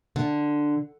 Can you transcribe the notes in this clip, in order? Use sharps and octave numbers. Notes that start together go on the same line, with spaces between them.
D3